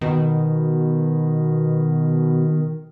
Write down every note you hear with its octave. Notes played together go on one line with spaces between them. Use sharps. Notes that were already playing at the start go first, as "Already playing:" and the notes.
B2 D#3